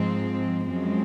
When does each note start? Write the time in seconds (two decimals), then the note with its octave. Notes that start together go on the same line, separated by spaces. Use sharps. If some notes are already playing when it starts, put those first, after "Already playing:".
Already playing: G#2 F3 G#3 C4
0.67 F#2 F3 G#3 C4